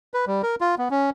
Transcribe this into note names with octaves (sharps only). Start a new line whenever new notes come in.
B4
G3
A#4
F4
B3
C#4